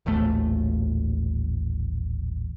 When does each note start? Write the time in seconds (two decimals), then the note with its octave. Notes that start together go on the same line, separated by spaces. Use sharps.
0.06 D#1 A1 D#2 A3